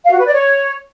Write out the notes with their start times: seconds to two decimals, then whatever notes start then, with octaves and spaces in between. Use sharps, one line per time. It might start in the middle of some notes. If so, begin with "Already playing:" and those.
0.05 F5
0.12 F#4
0.19 B4
0.26 D5
0.34 C#5